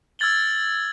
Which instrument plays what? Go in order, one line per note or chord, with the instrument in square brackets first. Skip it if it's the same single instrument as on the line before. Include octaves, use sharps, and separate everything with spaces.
[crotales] E6 F6 G#6 A6 F#7 G7